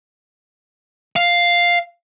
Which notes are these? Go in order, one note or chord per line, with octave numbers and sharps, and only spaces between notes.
F5